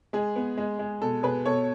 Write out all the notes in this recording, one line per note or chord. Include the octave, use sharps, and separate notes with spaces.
G#3 G#4
B3
G#3
G#3
B2 A4
B2 G#4 B4
B2 A4 C#5